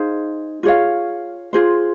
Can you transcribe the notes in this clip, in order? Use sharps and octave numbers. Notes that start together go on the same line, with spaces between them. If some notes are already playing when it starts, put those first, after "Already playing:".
Already playing: D#4 G#4 C5 F5
F4 G#4 C#5 F5
F4 G#4 C5